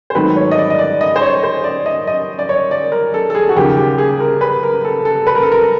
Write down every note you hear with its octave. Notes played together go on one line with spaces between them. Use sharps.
C5
G#2 D#3 F#3 A3 C4 B4
C#5
D#5
D5
D#5
D5
D#5
C5
C#5
C5
D5
D#5
D#5
D5
C#5
D5
A#4
A4
A4
G#4
F#4
D#2 C#3 F3 A#3 G4
G4
G#4
A#4
B4
A#4
A4
A4
B4
A#4
A4
A#4